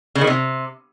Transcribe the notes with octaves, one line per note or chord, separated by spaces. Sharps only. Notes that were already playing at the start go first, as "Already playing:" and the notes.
C#3
D#3
C3